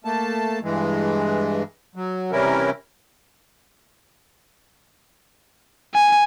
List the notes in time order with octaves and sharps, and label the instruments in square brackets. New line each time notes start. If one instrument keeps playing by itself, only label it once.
[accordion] A3 A#3 A5
G2 E3 G#3
F#3
C3 E3 G3 C#4 E4 A#4
[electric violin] G#5